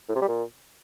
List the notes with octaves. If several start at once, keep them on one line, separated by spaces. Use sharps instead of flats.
A2
C3
G3
A#2